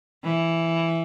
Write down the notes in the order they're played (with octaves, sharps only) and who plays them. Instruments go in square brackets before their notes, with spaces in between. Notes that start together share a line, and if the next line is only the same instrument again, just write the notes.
[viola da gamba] E3